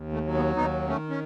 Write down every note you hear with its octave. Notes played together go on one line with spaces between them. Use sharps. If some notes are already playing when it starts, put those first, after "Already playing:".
Already playing: D#2
A3
F#3
B3
D#2 B3 D#4
D#3 A3 C#4
C#4